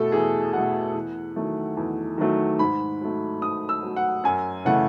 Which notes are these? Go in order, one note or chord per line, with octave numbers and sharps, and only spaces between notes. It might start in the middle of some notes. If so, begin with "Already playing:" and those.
Already playing: E2 B2 A3 A4
E2 G#4
B2 A3 F#5
E2
D#3 F#3 A3
E2
D#3 F#3 A3
G#2 B5
F#3 A3
G#2 D#6
E6
F#3 A3
F#5
F#2 G#5
C#3 E3 A3 F#5